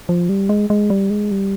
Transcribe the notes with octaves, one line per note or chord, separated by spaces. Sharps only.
F3
G3
G#3
G#3
G3
G#3
G3